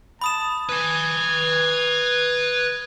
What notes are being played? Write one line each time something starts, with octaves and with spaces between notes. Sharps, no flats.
A5 B5 D#6 E7
B4 G#5 G#6